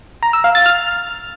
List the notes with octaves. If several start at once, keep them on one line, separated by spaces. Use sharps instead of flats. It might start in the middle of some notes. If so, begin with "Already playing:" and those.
A#5
E6
F5
A6
F6